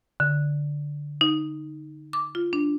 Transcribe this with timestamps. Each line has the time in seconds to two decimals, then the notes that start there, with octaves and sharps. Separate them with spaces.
0.20 D3
1.21 D#4
2.13 D6
2.35 F4
2.53 D4